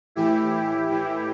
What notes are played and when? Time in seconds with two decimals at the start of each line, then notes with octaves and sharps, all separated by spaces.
0.15 A2 E3 E4 G4
0.88 A2 E3